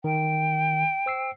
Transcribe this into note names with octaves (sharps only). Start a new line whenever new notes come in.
D#3 G5
C5 E6 C7